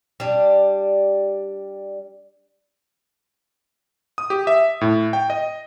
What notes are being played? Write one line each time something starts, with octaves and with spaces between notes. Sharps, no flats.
G3 D4
D#6
G4
E5
A2
G5
D#5